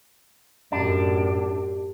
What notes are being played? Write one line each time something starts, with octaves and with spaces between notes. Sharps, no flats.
F#2 A2 D4 G4